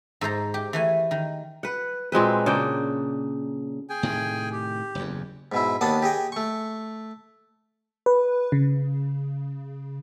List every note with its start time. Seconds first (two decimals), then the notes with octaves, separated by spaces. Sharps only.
0.21 G#2 A4 C5 A#5
0.54 G4
0.73 E3 A3 G#5
1.11 D#3
1.63 B4 F#5
2.12 A#2 G#3 C4 B4
2.46 C#3 A#3 D4 G5
3.89 G#4 G5 G#5
4.03 A2 C3 D#3
4.52 G4
4.95 F#1 E2
5.52 G#2 B2 E4
5.81 D#2 B3 D4 F#5 A5 D#6
6.02 G4 G#4 D#5 G5
6.32 A3 C#6
8.06 B4
8.52 C#3